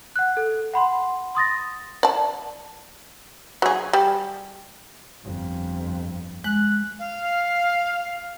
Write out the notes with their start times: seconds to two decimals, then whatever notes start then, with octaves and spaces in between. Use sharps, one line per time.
0.16 F#5 F#6
0.37 A4
0.74 F#5 B5 C6
1.35 C6 D#6 A6 A#6
2.03 D5 A5
3.62 F#3 G#4
3.93 G3
5.23 G1 F2
6.44 G#3 F#6
6.99 F5